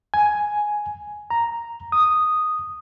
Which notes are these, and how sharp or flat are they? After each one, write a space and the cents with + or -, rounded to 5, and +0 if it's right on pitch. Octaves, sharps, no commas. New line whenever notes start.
G#5 +5
A#5 +0
D#6 -5